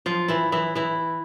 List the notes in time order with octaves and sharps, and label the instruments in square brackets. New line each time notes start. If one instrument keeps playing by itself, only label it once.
[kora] F3 F4
E3 E4
E3 E4
E3 E4